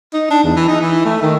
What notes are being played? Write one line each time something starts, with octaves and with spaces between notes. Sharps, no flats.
D#4
D4
E2
E3
D#4
E3
A3
D#3